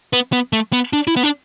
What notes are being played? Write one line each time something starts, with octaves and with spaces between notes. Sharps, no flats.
B3
B3
A3
B3
D4
E4
B3
D4